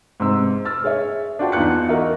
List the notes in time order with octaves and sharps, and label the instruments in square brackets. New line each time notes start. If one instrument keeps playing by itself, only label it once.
[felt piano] G#2 C3 E6
E6 F6 A6
G#4 C#5 E5
D4 F4 F#4 G5 A5
E2 D#4 F4 F#6 C#7
F#4 A#4 D#5 E5